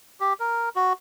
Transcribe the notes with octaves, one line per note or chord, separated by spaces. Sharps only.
G4
A#4
F#4